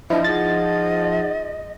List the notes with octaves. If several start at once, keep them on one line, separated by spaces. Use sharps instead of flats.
F3 D4 E4 D#5
D#4 G#4 F#5 A6